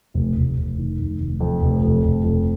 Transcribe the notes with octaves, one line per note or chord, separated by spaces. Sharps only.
F1
F1
F1
D#3
F1
F1
F2
F1
F2
F1
F2